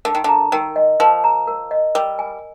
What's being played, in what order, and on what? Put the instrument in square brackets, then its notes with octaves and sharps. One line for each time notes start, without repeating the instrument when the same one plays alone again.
[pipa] D3 [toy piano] A#4
[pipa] D#3
[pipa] D3 [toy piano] A#5
[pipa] D#3 [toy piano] A#4
[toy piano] D#5
[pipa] F3 [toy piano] A#4
[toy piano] A#5
A#4
D#5
[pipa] G3 [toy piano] A#4
[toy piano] G#5